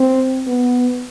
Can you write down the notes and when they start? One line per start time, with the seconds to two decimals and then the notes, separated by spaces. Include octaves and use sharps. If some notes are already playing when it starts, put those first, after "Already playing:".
Already playing: C4
0.47 B3